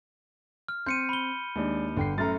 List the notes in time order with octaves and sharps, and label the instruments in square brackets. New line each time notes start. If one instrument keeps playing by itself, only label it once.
[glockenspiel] F6
[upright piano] C4 [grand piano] C6 [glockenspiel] G6 C#7 D#7
[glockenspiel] B5 G7
[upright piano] D#2 [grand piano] G#3 D4
[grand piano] G1 [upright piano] D3 G5 C7
[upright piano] F#2 A2 A3 [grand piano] A#5 F6 A6